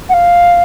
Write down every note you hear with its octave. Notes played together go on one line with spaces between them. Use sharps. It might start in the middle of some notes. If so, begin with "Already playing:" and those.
F#5
F5